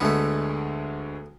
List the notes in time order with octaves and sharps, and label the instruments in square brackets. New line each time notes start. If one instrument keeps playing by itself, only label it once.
[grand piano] D2 D3 G#3 [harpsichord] A3 B3